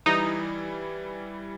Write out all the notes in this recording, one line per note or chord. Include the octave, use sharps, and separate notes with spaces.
E3 G3 D#4 E4